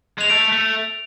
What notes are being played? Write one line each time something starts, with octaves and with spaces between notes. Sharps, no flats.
G#3 F7
A3 D7
A3